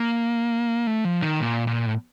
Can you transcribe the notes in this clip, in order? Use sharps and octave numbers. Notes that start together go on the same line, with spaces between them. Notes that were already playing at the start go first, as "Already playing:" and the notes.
Already playing: A#3
A3
F3
D#3
A#2
A#2
A2